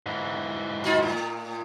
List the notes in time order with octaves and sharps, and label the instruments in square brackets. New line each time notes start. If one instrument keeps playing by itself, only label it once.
[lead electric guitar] G#2 E3
[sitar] D#4 F4 F#4
A2 A#3